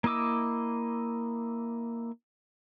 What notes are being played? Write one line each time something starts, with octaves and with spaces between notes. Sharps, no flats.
A#3 E4 D#5 D6 E6